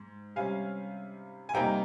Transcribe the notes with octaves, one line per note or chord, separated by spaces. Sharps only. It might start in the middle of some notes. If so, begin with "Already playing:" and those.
Already playing: G#2
C3 G3 C#4 F5 G#5
G#5
C3 G3 A#3 D#4 G5 A#5